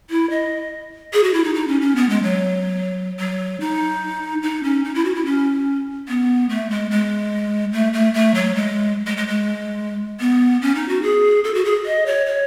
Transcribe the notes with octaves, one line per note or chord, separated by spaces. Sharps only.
E4
D#5
G#4
F#4
E4
D#4
D#4
C#4
C#4
B3
G#3
F#3
F#3
D#4
D#4
C#4
D#4
E4
F#4
E4
C#4
B3
A3
G#3
G#3
A3
A3
A3
F#3
G#3
G#3
G#3
G#3
B3
C#4
D#4
F#4
G#4
A4
F#4
G#4
D#5
C#5
C#5